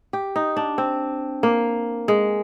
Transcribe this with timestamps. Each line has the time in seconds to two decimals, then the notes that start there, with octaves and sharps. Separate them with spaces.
0.13 G4
0.36 D#4
0.57 D4
0.78 C4
1.43 A#3
2.08 G#3